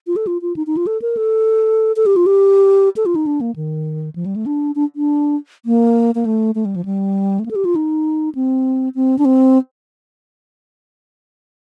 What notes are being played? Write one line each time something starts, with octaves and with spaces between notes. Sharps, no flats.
F4
A4
F4
F4
D#4
D#4
F4
A4
A#4
A4
A4
G4
F4
G4
A4
F4
D#4
D4
A#3
D#3
F3
G3
A3
D4
D4
D4
A#3
A#3
A3
A3
G3
F3
G3
A3
A#3
A4
G4
F4
D#4
C4
C4
D4
C4